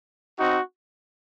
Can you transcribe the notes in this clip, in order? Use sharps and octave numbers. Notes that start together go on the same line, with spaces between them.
C4 D#4 F#4